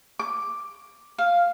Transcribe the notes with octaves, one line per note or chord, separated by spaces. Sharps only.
D6
F5